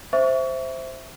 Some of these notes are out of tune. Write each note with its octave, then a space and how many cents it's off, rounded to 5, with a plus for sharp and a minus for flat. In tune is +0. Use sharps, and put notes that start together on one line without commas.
C5 +0 E5 +0 C#6 +30